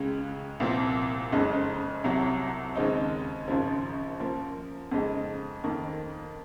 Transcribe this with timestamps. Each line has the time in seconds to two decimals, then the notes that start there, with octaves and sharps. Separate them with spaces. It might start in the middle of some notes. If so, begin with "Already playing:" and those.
Already playing: C#2 C#3 G#3
0.60 C2 A#2 F3 C4
1.32 F#1 F2 C#3 G#3 D#4
2.04 C2 C3 F#3
2.76 D#2 C#3 G#3 C4 D#4
3.48 G#1 F#2 C#3 F3
4.20 F#2 F3 A#3
4.91 F2 C#3 G#3 D#4
5.63 F2 D#3 A#3 D#4